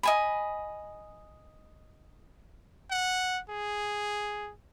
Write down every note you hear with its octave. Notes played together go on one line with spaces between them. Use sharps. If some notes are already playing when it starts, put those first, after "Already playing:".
D#5 G#5 B5
F#5
G#4